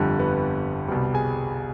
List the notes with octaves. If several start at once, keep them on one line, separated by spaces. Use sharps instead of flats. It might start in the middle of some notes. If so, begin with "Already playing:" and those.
Already playing: G1 F2 D3 G3 G4
B3 B4
C2 B2 G3
G#4 G#5